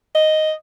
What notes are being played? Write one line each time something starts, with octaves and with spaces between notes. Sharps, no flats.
D#5